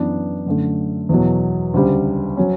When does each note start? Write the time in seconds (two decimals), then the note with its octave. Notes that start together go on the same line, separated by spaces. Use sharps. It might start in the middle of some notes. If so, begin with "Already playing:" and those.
Already playing: F#2 E3 B3 D4
0.46 F#2 D3 A3
1.09 E2 B2 F#3
1.74 D2 C#3 G3
2.37 F#3 C#4